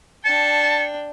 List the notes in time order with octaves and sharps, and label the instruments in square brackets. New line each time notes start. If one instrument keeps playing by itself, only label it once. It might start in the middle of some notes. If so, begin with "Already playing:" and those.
[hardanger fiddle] D4 G5 [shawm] A5 [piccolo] C#7